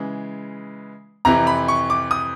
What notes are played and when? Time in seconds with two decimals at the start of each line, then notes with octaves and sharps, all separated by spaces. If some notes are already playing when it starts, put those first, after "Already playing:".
Already playing: C#3 E3 G#3
1.25 F2 C3 E3 A#5
1.47 B5
1.68 C#6
1.90 D6
2.11 D#6